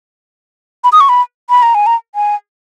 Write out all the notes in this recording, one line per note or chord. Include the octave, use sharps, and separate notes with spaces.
B5
D#6
C#6
B5
B5
A#5
G#5
A#5
G#5